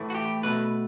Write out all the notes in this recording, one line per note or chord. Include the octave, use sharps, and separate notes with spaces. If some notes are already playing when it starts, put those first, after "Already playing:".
Already playing: A2 E3 A3
F#4
G4
B2 A3 B4